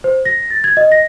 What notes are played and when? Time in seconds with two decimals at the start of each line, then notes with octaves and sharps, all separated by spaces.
0.04 C5
0.25 A#6
0.50 A6
0.64 G#6
0.77 D#5
0.92 A#6